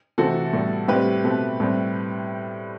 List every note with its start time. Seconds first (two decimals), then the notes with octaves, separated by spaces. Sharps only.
0.18 C3 E3 A3 C4 F#4 A4
0.53 A2 G3 B3
0.88 A2 G3 C4 G4 B4
1.24 B2 A3 C4
1.60 A2 G3 C4